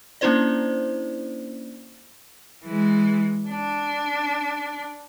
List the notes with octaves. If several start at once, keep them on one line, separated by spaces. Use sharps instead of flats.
A#3 C#4 D4 E4 C5 D5
E3 G#3
D4